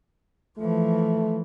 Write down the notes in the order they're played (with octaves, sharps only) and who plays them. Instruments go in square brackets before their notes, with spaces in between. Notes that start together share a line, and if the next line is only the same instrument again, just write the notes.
[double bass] E3 F3 [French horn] A3